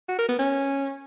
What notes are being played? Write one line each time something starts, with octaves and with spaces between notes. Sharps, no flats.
F#4
A#4
B3
C#4